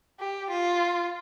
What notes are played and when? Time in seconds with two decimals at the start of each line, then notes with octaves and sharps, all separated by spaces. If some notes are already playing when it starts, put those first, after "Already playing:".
0.20 G4
0.50 F4